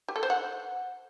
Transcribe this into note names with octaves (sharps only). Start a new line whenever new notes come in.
G4
A4
C5
F#5